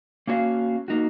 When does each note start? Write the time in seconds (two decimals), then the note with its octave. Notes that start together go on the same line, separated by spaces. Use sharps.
0.27 A#3 C#4 F#4 C#5 F5
0.88 A#3 D#4 F#4